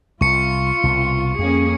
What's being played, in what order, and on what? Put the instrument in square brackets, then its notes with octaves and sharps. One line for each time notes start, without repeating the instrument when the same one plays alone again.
[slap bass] C2 [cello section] F4 [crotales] C#6 C#7
[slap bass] C2 B2
[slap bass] F2 [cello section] A#3 C#4 G#4